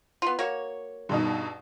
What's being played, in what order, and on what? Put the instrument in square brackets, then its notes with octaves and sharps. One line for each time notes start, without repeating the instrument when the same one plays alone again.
[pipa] B3 F4
A#3 F#4 C#5
[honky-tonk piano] G2 B2 D#4